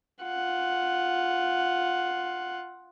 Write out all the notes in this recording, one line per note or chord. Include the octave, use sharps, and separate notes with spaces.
F4 F#5